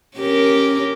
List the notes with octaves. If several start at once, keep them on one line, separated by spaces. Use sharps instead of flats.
C#4 G4 A#4